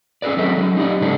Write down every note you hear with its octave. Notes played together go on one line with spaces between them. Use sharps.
C#4 G#4 A4 B4 D5
F#3 C4 A4 D#5 E5
F#3 B3 C#4
D#4 G4 A4 D5 D#5
G#2 C#3 G#3 C#4 D4 A4